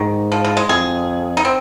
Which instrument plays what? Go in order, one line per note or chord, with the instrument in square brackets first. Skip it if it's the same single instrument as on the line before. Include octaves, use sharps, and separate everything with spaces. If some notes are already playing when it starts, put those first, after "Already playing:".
Already playing: [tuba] G#2 [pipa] D#3
[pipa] F3
F3
G#3
[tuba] F2 [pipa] G#4
[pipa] D#4
C4